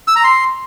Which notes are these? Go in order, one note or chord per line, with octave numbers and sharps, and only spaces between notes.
E6
A#5
C6